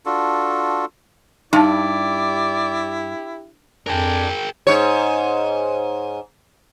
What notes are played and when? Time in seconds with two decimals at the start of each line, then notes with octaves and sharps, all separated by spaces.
0.06 D4 F4 F#4 A4
1.53 G2 D#4 E4 G4 D5 A5
3.87 F2 D4 G#4 A#4 D5 G5 G#5
4.67 G#2 C#5